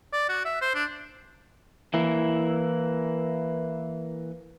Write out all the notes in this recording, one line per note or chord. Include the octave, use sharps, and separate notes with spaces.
D5
F#4
E5
C5
D4
E3 A#3 E4